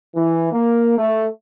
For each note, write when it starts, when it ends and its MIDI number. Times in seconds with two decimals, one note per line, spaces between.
0.16 0.51 52
0.53 0.96 58
0.98 1.26 57